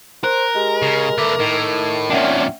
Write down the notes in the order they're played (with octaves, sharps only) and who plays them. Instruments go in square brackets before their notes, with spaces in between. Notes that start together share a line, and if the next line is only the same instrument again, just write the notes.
[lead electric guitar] A#4 [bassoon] C5 [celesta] F#6
[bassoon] G#3 [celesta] G4
[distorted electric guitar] C#3
[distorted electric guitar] D3 B4 [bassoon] A3 [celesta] D6
[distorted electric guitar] A2 [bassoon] D#3
[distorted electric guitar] F2 A#2 [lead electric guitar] C#4 D4 [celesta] E5 F#5 G5